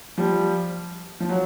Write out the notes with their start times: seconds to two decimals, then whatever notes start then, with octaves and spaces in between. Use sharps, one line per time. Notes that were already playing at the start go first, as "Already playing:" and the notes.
0.18 F3 G3
1.20 F3
1.29 F#3